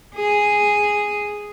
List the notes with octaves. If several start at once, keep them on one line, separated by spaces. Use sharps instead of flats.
G#4